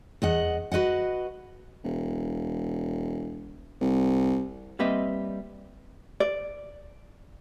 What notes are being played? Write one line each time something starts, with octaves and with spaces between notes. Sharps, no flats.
E2 D#5 F#5
F#4 B4 D#5 F#5
E1
C2
G3 A#3 C4 B4 D#5 E5
D5